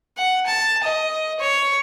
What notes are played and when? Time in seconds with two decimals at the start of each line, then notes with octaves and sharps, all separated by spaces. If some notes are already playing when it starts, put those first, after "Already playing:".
0.17 F#5
0.46 A5
0.83 D#5
1.39 C#5